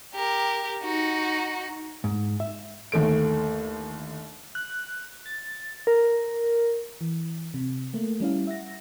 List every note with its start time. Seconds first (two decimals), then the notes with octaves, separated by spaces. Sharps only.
0.14 G4 A#4
0.83 D#4 F#4
2.04 G#2
2.40 E5
2.92 G1 D#2 A3 D7
4.55 F#6
5.26 A6
5.87 A#4
7.01 E3
7.54 C3
7.94 A3 A#3
8.20 G3 C#4 E4 F5
8.47 E5 F#5 A#6